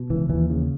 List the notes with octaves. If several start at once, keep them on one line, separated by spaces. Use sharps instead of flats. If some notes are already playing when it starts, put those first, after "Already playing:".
Already playing: B2
C#2 E3
D#2 E3
C#3